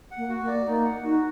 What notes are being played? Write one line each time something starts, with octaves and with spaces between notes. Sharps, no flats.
F#5
A#3
F#4
A#3
D5
A#3 D#4
F#5
D#4 F#4